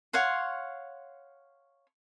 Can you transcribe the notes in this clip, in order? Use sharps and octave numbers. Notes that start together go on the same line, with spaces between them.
C#5 F5 F#5 C6